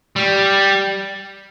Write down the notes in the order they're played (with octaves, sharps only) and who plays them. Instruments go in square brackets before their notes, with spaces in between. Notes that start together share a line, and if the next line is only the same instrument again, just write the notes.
[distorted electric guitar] G3